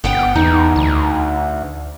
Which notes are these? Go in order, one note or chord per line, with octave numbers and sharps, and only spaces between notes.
G1 B3 F#5 G5
E2 D#4
D2